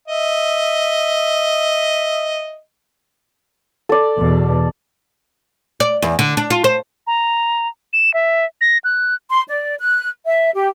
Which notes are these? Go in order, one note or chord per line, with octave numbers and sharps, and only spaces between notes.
D#5 E5
A4 D5
E2 B2
D5
E2
D3
D4
F4
C5
A#5
E7
E5
A#6
F#6
C6
D5
F#6
E5
G4